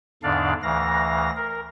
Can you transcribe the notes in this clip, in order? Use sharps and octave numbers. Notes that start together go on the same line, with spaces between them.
E2 G#2 D3 D4 D5 F5
D2 E3 F5 A#6
A#4